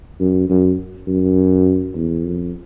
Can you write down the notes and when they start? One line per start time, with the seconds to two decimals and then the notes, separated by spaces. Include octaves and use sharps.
0.20 F#2
0.49 F#2
1.08 F#2
1.95 E2
2.25 F2